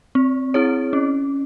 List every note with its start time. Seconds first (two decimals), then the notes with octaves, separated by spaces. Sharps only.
0.15 C4
0.54 E4 G#4 C#5
0.93 C#4